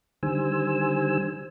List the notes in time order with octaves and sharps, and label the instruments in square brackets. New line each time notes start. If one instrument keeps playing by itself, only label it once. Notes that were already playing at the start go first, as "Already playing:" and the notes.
[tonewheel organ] D3 D#3 G3 C5 G#5 E6